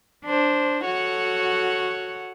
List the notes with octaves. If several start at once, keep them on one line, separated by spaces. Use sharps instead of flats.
D4 C5
F#4 A4 C#5 F#5